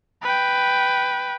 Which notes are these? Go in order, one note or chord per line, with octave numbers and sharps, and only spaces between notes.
B4 G5